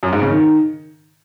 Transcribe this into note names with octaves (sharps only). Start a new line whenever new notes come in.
F#2
G#2
C#3
D#3